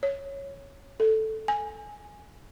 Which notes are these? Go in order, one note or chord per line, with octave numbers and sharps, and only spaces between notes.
C#5
A4
G#5